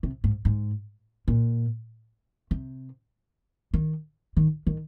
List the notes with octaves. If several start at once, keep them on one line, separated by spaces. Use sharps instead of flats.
C3
G#2
G#2
A#2
C3
D#3
D#3
D#3